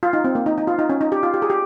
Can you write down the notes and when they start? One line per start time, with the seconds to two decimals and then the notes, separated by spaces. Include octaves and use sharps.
0.03 F4
0.13 D#4
0.24 C4
0.35 A#3
0.46 D#4
0.58 D#4
0.67 F4
0.79 D#4
0.89 C#4
1.01 D#4
1.12 G4
1.23 F4
1.34 G4
1.42 G#4
1.50 G4